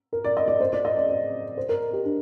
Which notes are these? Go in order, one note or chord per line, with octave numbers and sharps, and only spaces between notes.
A#4
D5
D#5
D5
C5
D5
D#5
D5
D5
C5
A#4
G4
D4